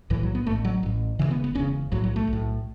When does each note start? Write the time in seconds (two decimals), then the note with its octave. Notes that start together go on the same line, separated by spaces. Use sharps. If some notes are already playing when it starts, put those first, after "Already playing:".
0.10 B1 A2 E3
0.23 F#3
0.35 B3
0.47 A1 A2 A3
0.65 F#3
0.83 A1 A2
1.19 E1 E2 C#3 E3
1.31 B3
1.44 B3
1.55 E1 E2 C#3 C#4
1.92 B1 A2 F#3
2.04 F#3
2.16 A3
2.27 B1
2.33 A2